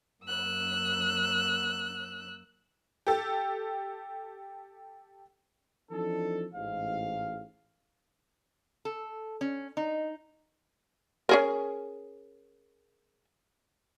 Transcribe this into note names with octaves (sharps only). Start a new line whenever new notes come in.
F#2 A#3 E6 F#6
G4 A4
E3 F3 C4 D4 D#4 A4
A1 G#2 F5
A4
C#4
D#4
C#4 G#4 A#4